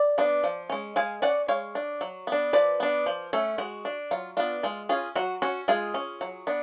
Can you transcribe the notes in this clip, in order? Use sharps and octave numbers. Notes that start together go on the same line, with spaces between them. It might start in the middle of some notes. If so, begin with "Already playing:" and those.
Already playing: D5
B3 D4
F3
G#3 C#4
G#3 F5 G#5
C#4 D5 F#5
G#3 C#5 F5
D4
F#3
B3 D4
F3 B4 D5
B3 D4
F3
A3 C#4
G#3 F#4
D4
F#3 F4
B3 D4 F4
G#3 F4
C#4 F4 G#4
F#3 F#4
C#4 F#4
G#3 F4 G#4
C#4
F#3
B3 D4